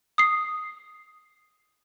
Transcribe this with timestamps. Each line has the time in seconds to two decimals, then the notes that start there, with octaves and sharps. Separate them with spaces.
0.18 D#6 C7